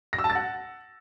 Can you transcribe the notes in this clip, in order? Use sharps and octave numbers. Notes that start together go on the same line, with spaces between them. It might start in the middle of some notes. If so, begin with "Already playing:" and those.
A#6
E6
A5
A6
F#5